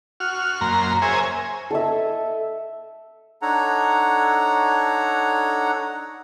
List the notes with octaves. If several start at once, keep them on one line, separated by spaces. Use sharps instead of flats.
F#4 F6
F#2 A#3 A#5 C6
G#4 A#4 C5 C#5 E5 G#5
A4 D#5 E5
D4 D#4 A4 C#5 F#5 A#5